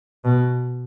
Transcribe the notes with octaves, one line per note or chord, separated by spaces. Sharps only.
B2